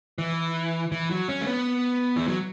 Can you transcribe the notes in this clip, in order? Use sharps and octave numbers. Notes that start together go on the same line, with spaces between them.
E3
E3
F#3
C#4
A3
B3
E3
F#3